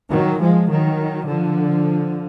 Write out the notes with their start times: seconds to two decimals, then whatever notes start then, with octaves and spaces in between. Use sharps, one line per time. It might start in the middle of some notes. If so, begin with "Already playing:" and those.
0.11 D#3 F#3
0.40 F3 G#3
0.69 D#3 F#3
1.28 D3 F3